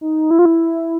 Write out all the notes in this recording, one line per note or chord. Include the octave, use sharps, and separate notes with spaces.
D#4
E4
F4
E4